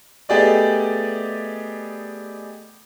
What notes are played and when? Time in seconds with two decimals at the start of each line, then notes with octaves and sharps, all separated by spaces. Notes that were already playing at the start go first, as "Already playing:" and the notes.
0.29 A3 B3 G4 G#4 D5 D#5